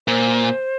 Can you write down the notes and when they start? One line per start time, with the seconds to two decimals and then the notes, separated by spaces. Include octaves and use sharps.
0.08 A#2 C5